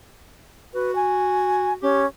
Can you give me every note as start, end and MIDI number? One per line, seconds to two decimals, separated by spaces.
0.74 1.75 66
0.74 0.94 71
0.96 1.73 80
1.82 2.06 61
1.82 2.03 67